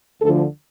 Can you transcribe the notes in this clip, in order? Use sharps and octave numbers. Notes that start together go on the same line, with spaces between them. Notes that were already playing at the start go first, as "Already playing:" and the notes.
D2 D3 F3 A4